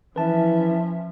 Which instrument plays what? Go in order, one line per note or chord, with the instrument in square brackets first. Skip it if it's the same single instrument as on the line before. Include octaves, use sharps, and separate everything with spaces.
[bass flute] E3 [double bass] F3 [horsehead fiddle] C#4 E5 [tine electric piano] B4 A5